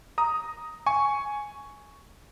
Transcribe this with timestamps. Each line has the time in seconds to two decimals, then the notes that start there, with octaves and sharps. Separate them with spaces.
0.18 A#5 D#6
0.86 G#5 C#6